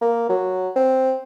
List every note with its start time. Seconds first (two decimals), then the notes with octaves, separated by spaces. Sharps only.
0.01 A#3
0.30 F#3
0.76 C4